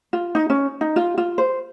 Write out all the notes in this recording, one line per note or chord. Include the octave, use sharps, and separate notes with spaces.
F4
D#4
C#4
D#4
F4
F4
C5